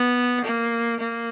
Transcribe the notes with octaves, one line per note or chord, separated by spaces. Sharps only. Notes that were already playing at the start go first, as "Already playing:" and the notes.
Already playing: B3
A#3
A#3